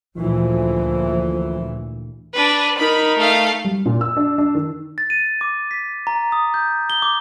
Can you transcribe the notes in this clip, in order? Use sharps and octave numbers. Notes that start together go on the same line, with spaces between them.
D2 A#2 E3 F3
D4 B4
D#4 A#4 B5
A3 F5
G3
A#2
E6
D4
D4
D#3
A6
D#7
D6
B6
A#5
D#6
G6
G7
D6